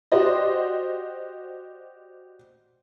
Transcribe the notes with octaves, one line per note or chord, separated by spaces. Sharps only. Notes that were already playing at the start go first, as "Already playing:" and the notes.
F#4 G4 C5 D5 D#5